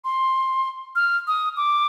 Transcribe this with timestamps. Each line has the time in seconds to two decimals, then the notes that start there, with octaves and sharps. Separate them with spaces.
0.04 C6
0.96 F6
1.27 D#6
1.57 D6